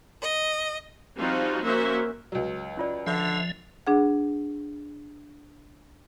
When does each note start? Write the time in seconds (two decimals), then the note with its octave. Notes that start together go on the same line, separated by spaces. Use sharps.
0.21 D#5
1.18 F3 G3 C4 D#4 F4 F#4
1.64 A#3 C#4 F#4 C5 E5
2.32 C#2 F#3
2.77 C#4 F4 D5
3.07 D3 F3 E5
3.87 D4 G#4 F#5